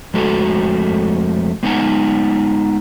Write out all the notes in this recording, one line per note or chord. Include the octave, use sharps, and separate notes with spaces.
F2 G#3 A3 F#4 A4
G#3 B3 D#4 F#5 G#5